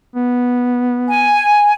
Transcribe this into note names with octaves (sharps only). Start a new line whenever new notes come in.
B3
G#5